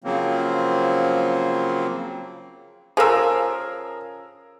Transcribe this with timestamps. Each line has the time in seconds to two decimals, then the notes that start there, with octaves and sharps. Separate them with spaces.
0.04 C#3 F3 F#3 A#3 C4
2.97 C#3 F3 G#4 A#4 E6